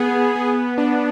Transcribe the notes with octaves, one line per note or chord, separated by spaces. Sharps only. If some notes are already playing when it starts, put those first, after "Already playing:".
Already playing: B3 G#4
B3
D4